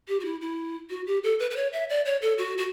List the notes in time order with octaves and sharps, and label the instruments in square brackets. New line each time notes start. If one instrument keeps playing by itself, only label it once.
[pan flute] G4
F#4
E4
E4
F#4
G4
A4
B4
B4
C#5
E5
D5
C#5
A4
F#4
F#4